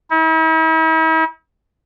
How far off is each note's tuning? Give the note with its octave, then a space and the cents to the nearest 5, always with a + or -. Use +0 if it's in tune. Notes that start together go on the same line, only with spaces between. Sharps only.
E4 -45